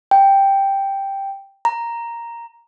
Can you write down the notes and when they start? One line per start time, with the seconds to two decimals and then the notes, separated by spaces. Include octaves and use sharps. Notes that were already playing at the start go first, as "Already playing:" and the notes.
0.11 G5
1.65 A#5